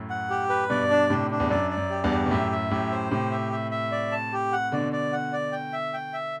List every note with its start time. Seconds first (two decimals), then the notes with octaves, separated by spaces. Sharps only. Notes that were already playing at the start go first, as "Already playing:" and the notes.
Already playing: F#2 A2
0.10 F#5
0.30 G4
0.50 B4
0.70 G2 B2 D5
0.91 D4
1.10 A2 C3 D4
1.31 D4
1.40 E2
1.50 F#2 D5
1.70 D5
1.77 F#2
1.90 G4
2.04 E2 G2
2.10 G4
2.26 B2
2.31 F#2 A2 E5
2.52 E5
2.71 F#2 A2 G4
2.91 C5
3.11 A2 C3 G4
3.31 E5
3.52 E5
3.71 E5
3.92 D5
4.12 A5
4.33 G4
4.52 F#5
4.72 B2 D3 D5
4.93 D5
5.13 F#5
5.33 D5
5.52 G5
5.73 E5
5.93 G5
6.13 E5